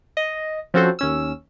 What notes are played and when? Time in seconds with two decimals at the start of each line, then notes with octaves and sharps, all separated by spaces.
0.17 D#5
0.74 F3 C4 C#4 F#4 A4 C5
0.99 D#2 C#4 E6